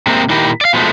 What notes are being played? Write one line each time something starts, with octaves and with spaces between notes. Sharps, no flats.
C3 G#3 A#3 C4
A#2 D#3 E4 G4 A#4
D5 F5
B2 F3 G#3 A3